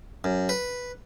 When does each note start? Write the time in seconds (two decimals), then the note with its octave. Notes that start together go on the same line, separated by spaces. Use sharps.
0.24 F#2
0.49 B4